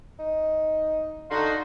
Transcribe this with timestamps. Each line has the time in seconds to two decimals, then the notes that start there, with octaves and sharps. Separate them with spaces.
0.19 D#4
1.31 D3 D#4 F4 F#4